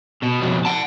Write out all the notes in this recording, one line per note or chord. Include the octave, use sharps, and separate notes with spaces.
B2
F2 B2
F#5 A5